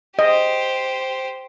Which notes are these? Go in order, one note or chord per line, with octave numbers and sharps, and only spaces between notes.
G4 C5 D#5